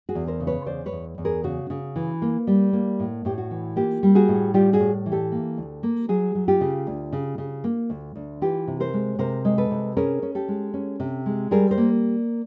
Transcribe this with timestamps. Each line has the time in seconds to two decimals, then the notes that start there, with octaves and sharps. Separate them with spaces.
0.09 F#4 G#4
0.15 E2
0.27 A#4 C5
0.40 C#3
0.47 B4 C#5
0.66 E2 C5 D5
0.86 B4 C#5
0.92 E2
1.18 E2
1.25 G#4 A#4
1.44 C#3 F#4
1.70 C#3
1.96 E3
2.22 A#3
2.47 G3
2.73 A#3
3.00 A2
3.25 A2 G4
3.38 F#4
3.51 E3
3.76 A#3 F4 G4
4.03 G3
4.15 F#4 G#4
4.28 A2
4.54 G3 F4 G4
4.73 F#4 G#4
4.80 A2
5.06 E3
5.12 G4 A4
5.32 A#3
5.57 D2
5.83 A#3
6.09 F#3 F#4 G#4
6.35 F#3
6.48 F4 G4
6.61 C#3
6.87 D2
7.13 C#3
7.38 C#3
7.64 A#3
7.90 D2
8.16 D2
8.42 E3 F4 G4
8.68 C3
8.80 A#4 C5
8.94 G#3
9.19 C3 A#4 C5
9.45 G#3
9.58 A4 B4
9.71 C3
9.97 C#4 G#4 A#4
10.23 C#4
10.35 G4 A4
10.48 G#3
10.74 C#4
11.00 C3
11.26 G#3
11.51 G3 G#4 A#4
11.71 A#4 C5
11.78 A#3